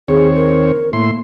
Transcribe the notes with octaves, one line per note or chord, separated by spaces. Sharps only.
D#2 C4 G#4 C#5
A#4
A2 A#3 E4 C6